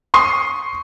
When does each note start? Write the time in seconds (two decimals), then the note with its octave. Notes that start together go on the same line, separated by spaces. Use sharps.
0.14 C6 C#6 D#6 C7